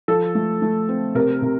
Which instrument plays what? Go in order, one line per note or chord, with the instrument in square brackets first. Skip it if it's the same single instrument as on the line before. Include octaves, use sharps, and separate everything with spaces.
[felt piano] F3 A4
A3
A3
C4
C3 A#4
C3